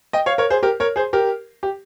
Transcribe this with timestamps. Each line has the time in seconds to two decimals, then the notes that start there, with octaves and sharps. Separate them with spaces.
0.13 D#5 G5
0.26 C#5 F5
0.38 A#4 C#5
0.50 G#4 C5
0.63 G4 A#4
0.80 A#4 C#5
0.96 G#4 C5
1.13 G4 A#4
1.63 G4